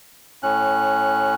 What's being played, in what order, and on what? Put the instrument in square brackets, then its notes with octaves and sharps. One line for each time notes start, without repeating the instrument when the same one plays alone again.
[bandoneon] A2 C#4 F#6